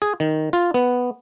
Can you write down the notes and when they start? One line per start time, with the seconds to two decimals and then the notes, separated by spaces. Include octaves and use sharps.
0.02 G#4
0.20 D#3
0.53 F4
0.74 B3